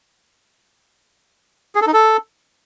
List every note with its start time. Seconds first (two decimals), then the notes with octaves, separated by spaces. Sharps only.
1.75 G#4
1.81 A4
1.87 D#4
1.93 A4